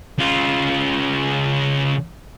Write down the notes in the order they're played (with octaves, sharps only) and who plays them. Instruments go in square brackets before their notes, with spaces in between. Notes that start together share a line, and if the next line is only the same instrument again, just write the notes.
[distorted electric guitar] C#3 F4